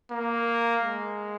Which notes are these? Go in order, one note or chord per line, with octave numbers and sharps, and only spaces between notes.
A#3
G#3